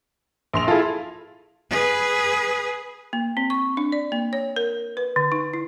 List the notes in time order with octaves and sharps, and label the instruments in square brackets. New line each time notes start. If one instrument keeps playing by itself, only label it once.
[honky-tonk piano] A#1 C6 F7
[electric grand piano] E4 F4 [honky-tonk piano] G#4 A4
[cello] G#4 B4
[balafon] A#3
C4
C#6
D4
D5
A#3
C#5
A#4
B4
D3
D#4
E4